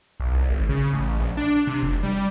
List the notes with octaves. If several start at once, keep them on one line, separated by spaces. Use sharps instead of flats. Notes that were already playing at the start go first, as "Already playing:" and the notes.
B1
C2
G#1
C#3
A1
A#1
D4
C3
F1
G3